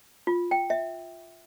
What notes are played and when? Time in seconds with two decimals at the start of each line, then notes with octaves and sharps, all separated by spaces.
0.27 F4
0.51 G5
0.70 E5